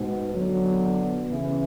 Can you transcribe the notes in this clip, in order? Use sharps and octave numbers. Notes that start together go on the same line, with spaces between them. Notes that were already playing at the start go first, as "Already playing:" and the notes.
Already playing: G#2 B2
B2 D3 F#3
C#3 E3